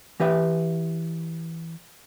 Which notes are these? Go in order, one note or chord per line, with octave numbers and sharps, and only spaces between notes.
E3 G4 B4 E5